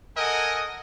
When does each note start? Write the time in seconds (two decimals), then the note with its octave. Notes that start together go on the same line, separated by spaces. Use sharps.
0.17 A4 A#4 D#5 F#5 G#5